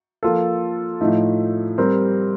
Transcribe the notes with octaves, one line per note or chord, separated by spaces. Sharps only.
F3 A#3 F4 A4
A2 F3 A3 D#4
G3 C4 G4 A#4